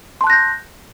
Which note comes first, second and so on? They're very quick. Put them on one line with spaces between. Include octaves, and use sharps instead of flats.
C6 A5 F#6 A#6 G6